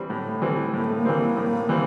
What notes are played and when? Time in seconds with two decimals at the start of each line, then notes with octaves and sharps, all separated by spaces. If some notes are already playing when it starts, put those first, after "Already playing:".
Already playing: E3 G3 C4
0.10 A2 A3
0.42 E3 G3 C4
0.74 A2 A#3
0.84 A3
0.96 A#3
1.05 E3 G3 C4
1.37 A2
1.69 E3 G3 C4